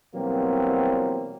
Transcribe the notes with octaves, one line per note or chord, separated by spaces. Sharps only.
B2 E3 F#3 G3 A#3 C4